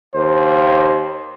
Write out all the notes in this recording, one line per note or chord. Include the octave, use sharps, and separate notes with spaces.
D#2 C5